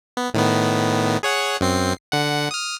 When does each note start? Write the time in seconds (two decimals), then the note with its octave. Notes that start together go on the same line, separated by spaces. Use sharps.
0.17 B3
0.34 A2 D#3 B3
1.23 G#4 C#5 F#5
1.61 F#2 C4 C7
2.12 D3 F#5
2.51 D#6 F6